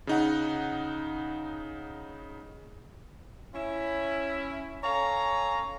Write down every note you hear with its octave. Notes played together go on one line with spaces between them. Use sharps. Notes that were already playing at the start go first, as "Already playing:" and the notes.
C#3 D#4 F#5
C#4 E4
C#4 A4 C#5 F5 G#5 A#5